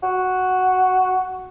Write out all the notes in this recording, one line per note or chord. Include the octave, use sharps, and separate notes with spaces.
F#4